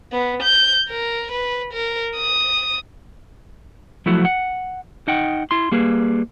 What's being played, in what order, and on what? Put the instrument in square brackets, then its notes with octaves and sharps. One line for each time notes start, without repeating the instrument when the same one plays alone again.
[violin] B3
G6
A#4
B4
A#4
D#6
[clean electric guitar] F3 F#3 A3 E4 F#4
F#5
D#4 D#5 F#5 G5
E4 C6
G3 A#3 G#4 B4